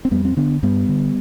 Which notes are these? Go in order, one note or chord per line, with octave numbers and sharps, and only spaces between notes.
C4
F2 G3 B3
C4
D3 B3 D4
G2 G3 B3
D3